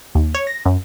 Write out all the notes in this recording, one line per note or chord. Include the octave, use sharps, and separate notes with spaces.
D#2
C#5
A#6
F#2